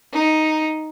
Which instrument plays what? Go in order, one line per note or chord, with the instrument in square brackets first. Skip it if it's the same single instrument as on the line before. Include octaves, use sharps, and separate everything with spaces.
[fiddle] D#4